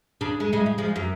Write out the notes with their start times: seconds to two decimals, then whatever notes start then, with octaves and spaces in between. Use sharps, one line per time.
0.21 C#3 D4
0.40 G#3
0.52 A2 C#3 G#3
0.66 C#3
0.78 F3 G#3
0.96 F#2